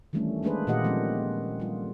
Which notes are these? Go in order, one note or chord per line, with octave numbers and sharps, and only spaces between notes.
D#3 E3 G3 A3 C#4 D4
G#3 A#3 D4 G#4 B4 C5
A#2 D#3 F4 G4 D#5 F#5
D#3 F3 G#3 A#3 C4 C#4
G3 F4